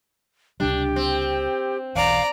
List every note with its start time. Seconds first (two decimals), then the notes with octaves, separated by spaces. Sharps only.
0.60 C#2 C3 G3 D4 G4
0.96 C4
1.95 E1 B1 E2 D5 F5 A#5